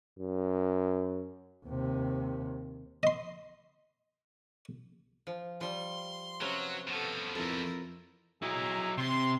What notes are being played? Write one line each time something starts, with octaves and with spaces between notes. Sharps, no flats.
F#2
D#2 C3
D#5 C6
F3
F3 G3 C6
C3 F#3 C#4 B4
B2 F3 F#4 A4
F2 E4 A4 A#4
F#3 E4 G#4 D#5 A#5
C3 C6